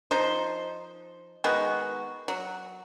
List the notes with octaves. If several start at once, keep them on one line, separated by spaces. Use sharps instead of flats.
F3 D#4 C5
D#3 G#3 B3 F#4
F#3